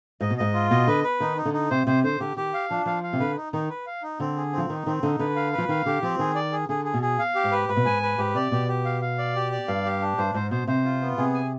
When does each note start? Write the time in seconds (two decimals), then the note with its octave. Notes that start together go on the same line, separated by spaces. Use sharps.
0.21 G#2 D#5
0.30 B2
0.38 G#2 D#5
0.54 F4
0.71 B2 D#5
0.87 D3 B4
1.04 B4
1.20 D#3 D#4
1.37 D#4
1.45 D3
1.54 D#4
1.70 C3 C5
1.87 C3 C5
2.04 D3 C5
2.20 D3 G4
2.37 D#3 G4
2.54 F5
2.70 F3 D4
2.86 F3 F5
3.03 F5
3.13 C3
3.20 D3 B4
3.36 D#4
3.53 D#3 D#4
3.70 B4
3.87 F5
4.03 D#4
4.20 D3 C4
4.36 G#4
4.53 F3 C4
4.69 D#3 D#4
4.86 D#3 C4
5.02 D3 D#4
5.19 D3 B4
5.36 F5
5.53 B4
5.58 F3
5.69 D#3 F5
5.86 D3 G4
6.02 F3 C4
6.19 D#3 G#4
6.35 D5
6.52 G#4
6.69 D3 G#4
6.85 G#4
6.94 B2
7.02 G#4
7.19 F5
7.35 G4
7.44 G#2
7.52 B4
7.69 G#2 B4
7.77 B2
7.85 G#2 G#5
8.02 B4
8.18 G#2 G4
8.35 C3 D5
8.51 B2 G4
8.68 G4
8.85 F5
9.02 F5
9.18 D5
9.35 G4
9.52 D5
9.68 G2 F5
9.85 G4
10.01 D4
10.18 G2 C5
10.34 G#2 C5
10.51 B2 C5
10.68 C3 C5
10.84 F4
11.01 B3
11.18 C3 G#4
11.34 G#5